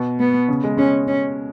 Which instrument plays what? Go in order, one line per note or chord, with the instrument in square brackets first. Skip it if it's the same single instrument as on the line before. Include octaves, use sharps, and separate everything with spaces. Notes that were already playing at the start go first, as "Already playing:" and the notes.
Already playing: [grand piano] B2
[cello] B3
[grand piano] C#3
G#3
[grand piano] G#3 [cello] C#4
[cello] C#4